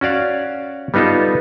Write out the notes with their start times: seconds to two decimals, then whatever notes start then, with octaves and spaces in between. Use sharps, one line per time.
0.01 C#4 F#4 D5 F5
0.94 G3 B3 D#4 F4 A4